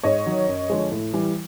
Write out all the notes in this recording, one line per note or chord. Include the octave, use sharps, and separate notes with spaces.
G#2 C#5 D#5
D#3 F#3
F#2
D3 F3 G#3
A2
E3 G3